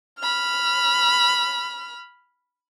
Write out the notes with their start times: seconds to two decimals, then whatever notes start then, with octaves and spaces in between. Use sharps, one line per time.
0.20 B5 F6